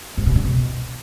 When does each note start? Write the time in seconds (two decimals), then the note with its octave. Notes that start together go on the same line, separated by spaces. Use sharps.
0.17 G#2
0.26 B2
0.35 D3
0.44 B2